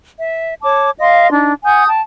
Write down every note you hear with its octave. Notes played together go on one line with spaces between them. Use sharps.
E5
C#5 A5 D6
D#5 F5 C6
D4 D#4
F#5 G#5 D#6 G6
G5 A5